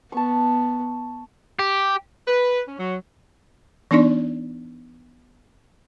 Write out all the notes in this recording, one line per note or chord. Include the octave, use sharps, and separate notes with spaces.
B3 A5 C#6
G4
B4
C#4
F#3
E3 B3 D4 D#4 D5